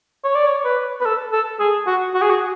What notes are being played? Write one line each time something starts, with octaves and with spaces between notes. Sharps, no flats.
C#5
D5
C#5
B4
B4
A4
A4
G#4
F#4
F#4
G#4
F#4